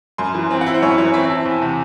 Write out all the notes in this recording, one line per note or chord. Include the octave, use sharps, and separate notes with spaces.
F#2 C6
E3
C4
F#5
E4
C5
F#2 C#5
E3 C#5
C4 E5
E4 A5
E2
C3